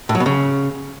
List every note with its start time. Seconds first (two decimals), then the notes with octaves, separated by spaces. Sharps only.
0.09 A2
0.15 F#3
0.20 B2
0.26 C#3